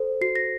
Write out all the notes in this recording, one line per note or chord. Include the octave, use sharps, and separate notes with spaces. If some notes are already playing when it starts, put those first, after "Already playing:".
Already playing: A4 C5
F#4 C7
A#6